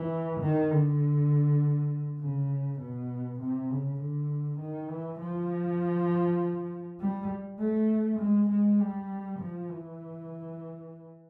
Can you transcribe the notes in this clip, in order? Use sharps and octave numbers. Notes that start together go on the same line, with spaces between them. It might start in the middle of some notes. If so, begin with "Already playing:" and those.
Already playing: E3
D#3
D3
C#3
B2
C3
C#3
D3
D#3
E3
F3
G3
A3
G#3
G#3
G3
F3
E3